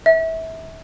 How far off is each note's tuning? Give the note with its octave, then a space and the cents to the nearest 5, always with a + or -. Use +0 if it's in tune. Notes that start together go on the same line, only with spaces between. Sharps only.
E5 -25